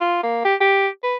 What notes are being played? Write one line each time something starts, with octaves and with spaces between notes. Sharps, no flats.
F4
A#3
G4
G4
B4